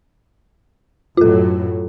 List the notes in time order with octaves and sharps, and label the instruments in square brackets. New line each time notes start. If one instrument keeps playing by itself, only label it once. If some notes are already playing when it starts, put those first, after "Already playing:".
[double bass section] F#2 A2 F#3 [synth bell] F4 A4